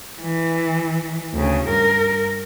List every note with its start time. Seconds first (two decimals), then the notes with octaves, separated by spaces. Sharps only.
0.22 E3
1.34 D2 C#3
1.68 G2 A#4